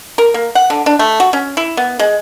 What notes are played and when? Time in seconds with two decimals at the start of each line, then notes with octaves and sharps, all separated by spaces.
0.18 A#4
0.34 A#3
0.55 F#5
0.70 D3
0.86 D4
0.99 A3
1.20 F#4
1.33 C#4
1.57 E4
1.77 B3
1.99 G#3